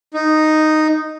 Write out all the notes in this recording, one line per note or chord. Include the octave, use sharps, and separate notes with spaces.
D#4